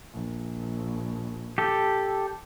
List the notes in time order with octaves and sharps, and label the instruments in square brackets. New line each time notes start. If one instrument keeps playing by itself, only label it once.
[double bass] A#1
[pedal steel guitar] G4 A4